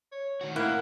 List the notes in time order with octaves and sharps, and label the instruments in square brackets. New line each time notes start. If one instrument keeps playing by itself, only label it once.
[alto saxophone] C#5
[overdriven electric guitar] D#3 F#4
[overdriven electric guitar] A2 [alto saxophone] A#3 [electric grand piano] E4 [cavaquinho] F#5